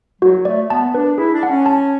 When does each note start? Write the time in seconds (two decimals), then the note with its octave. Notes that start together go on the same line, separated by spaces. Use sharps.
0.22 F#3 F#4
0.45 A3 D5
0.70 B3 A5
0.94 D4 B4
1.18 E4 G#4
1.34 D4
1.43 F#5
1.51 C#4
1.66 A5